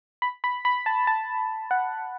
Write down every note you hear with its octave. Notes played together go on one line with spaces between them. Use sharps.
B5
B5
B5
A5
A5
F#5